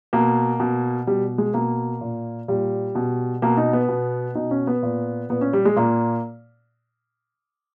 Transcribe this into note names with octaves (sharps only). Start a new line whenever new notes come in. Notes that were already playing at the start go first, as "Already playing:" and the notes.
B2 A#3
B2
B2 G3
G#3
B2 A#3
A#2
A#2 G3
B2
B2 A#3
D#4
B3
B2
B2 D#4
C#4
B3
A#2
A#2 B3
C#4
G3
G#3
A#2 A#3